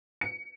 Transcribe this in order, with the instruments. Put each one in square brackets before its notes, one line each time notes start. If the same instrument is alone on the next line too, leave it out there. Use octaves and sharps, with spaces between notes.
[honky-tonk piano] C#7